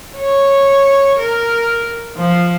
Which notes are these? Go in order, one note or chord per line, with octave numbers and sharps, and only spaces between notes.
C#5
A#4
F3